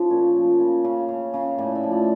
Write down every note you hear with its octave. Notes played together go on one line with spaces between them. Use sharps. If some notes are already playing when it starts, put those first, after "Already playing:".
Already playing: C#3 F3
A#2 C#5
F3
C#3
C#3
C#3
C#3
A2 D5
E5
F3
D5